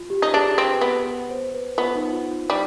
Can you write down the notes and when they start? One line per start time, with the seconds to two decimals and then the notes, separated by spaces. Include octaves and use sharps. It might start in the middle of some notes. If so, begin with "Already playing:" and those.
Already playing: F4
0.10 G4
0.22 D#4
0.34 D4 G#4
0.58 C4
0.70 B4
0.81 B3
1.06 B4
1.30 C5
1.54 B4
1.78 B3 F4
1.95 D#4
2.13 F4
2.31 F4
2.50 G3 D#4